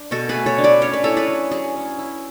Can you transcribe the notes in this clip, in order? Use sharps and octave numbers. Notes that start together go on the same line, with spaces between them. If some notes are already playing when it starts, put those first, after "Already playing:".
Already playing: D4
B2 F#4 A4
G#4 B4
A3
A4 C#5
D4
B4 D5
C#4 C#5
B4
E4 A4 C#5
G#4 B4
F#3
F#3 G#4
C#4
E4